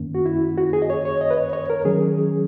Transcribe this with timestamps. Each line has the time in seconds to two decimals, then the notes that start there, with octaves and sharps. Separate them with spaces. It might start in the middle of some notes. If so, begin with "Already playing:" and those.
Already playing: F#2 D#3 A#3 C#4
0.15 F#4
0.26 E4
0.57 F#4
0.73 G#4
0.82 D#5
0.90 C#5
1.05 C#5
1.21 D#5
1.31 B4
1.37 C#5
1.53 C#5
1.70 A#4
1.85 D#3 F#3 C#4 G#4